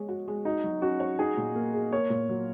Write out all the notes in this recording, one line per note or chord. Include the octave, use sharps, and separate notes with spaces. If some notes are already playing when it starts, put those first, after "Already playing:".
Already playing: G#3 C#5
F#4
G#3
D#4 F#4
F#3
C#4 F#4
C#5
D#4 G#4
A#2
A#3
G#4
A#3 C#5
A#2
F#3